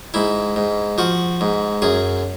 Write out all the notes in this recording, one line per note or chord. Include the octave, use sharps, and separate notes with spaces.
G#2 E4
G#2
F3 F#4
G#2
F#2 G#4